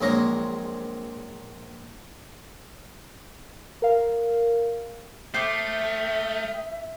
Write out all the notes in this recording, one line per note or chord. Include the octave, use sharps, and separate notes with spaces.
A#1 F#3 G#3 A#3 C4 A#5
A#4 F5
A3 C5 E5 G5 D6 D#6 F6